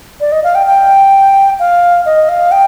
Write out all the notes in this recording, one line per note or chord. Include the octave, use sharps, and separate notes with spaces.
D5
D#5
F5
G5
G5
F5
D#5
F5
G5